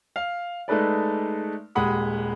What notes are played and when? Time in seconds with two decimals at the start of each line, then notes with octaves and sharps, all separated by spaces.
0.16 F5
0.68 G#3 A3 D#4 A4 B4 D5
1.75 D#1 G#3 G4 F#5 B5 D#6